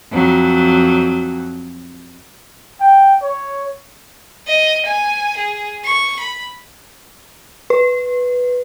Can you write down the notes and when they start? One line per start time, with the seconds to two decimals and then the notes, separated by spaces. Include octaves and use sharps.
0.12 F2 F#3
2.80 G5
3.22 C#5
4.47 D#5
4.85 G#5
5.37 G#4
5.84 C#6
6.20 B5
7.70 B4